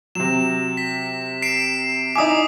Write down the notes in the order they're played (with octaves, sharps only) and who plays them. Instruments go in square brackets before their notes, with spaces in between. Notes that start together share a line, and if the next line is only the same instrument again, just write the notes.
[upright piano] C3 F#3 [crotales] E7
[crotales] B6
C7 D7 E7
[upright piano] D#4 E4 G#5 [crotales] D6 D#6